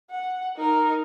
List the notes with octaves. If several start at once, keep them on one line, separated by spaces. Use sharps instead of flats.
F#5
D#4 A#4